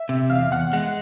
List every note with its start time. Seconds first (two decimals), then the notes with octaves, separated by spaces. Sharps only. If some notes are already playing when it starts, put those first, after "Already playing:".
Already playing: E5
0.09 C3
0.30 E2 F5
0.51 E2 F#5
0.73 G#3 F#5